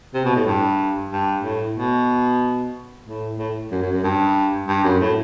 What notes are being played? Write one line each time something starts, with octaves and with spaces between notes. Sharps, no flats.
C3
B2
A2
G2
G2
A2
B2
A2
A2
F#2
F#2
F#2
G2
G2
F#2
A2